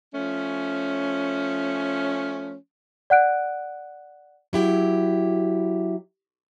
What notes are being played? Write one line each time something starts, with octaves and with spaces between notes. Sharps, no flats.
F3 A3 C#4
D5 F#5 F#6 D7
F#3 E4 G4